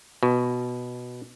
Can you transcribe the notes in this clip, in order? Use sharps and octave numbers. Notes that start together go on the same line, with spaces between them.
B2